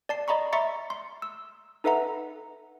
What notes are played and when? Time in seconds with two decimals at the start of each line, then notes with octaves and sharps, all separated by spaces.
0.09 D5 A5 C7
0.28 D5 D#5 A#5 B5 C#6
0.53 E5 A#5 C6 C#6 A6 C#7
0.90 C6
1.22 E6
1.84 D#4 A4 B4 E5 F#5 A#5